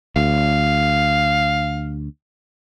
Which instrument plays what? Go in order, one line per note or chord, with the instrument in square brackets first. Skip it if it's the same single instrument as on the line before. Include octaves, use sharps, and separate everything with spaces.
[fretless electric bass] D2 [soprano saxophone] F5